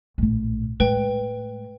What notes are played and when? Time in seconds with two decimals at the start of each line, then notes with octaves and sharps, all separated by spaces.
0.18 A#1 A2
0.80 A2 G#3 B4 G5